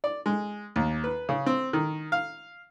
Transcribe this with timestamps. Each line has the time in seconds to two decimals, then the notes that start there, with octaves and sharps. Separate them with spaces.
0.04 D5
0.26 G#3
0.76 D#2
1.04 B4
1.29 C#3
1.46 C4
1.73 D#3
2.12 F5